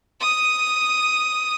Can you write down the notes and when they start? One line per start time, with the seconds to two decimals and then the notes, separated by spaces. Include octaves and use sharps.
0.21 D#6 D#7